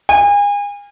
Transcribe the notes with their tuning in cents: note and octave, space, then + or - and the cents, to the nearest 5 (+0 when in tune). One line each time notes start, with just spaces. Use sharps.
G#5 -35